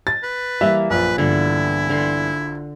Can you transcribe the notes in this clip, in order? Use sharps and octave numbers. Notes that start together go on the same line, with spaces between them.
A6
B4
E3 G3 A#3 E5
A#1 F#2 B4
G2 D3 E3 B3 E4
D3 C6